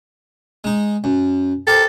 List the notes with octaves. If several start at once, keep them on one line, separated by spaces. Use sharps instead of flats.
G#3 D#4
F#2
G4 A4 A#4 C5